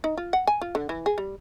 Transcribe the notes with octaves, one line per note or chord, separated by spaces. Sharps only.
D#4
F4
F#5
G#5
F4
D3
E3
G#4
G3